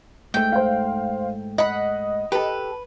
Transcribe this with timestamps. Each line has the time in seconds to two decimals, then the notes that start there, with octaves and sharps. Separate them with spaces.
0.34 G#2 A3 G5
0.52 C5 F5
1.58 D#5 F#5 B5
2.32 G4 A4 B4